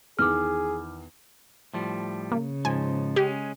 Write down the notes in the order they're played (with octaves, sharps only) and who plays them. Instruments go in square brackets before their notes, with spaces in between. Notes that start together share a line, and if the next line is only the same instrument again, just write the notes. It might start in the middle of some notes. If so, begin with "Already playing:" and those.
[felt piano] E2 D#3 [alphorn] G#4 [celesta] D6 F6
[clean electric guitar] A2 F3 G3
[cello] C#3 [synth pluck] A#3
[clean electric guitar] G#2 F3 [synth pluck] G#5
[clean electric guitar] G#3 C#4 [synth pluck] G4